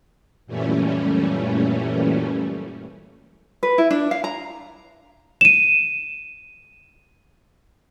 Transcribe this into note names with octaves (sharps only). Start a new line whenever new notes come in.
F#2 A#2 E3 G3 A3 C#4
B4
E4
D4
F5
A#5
D#7 E7